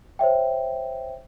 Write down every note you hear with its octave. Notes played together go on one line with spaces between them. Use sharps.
C5 C#5 E5 G5